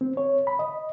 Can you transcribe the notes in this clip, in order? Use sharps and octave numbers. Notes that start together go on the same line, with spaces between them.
C4
C#5
B5
D#5